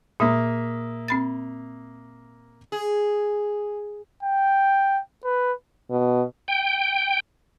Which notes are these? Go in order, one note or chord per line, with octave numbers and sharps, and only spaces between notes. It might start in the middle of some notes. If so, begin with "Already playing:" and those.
A#2 A#3 E5 D#6
C4 B5 A6
G#4
G5
B4
B2
G5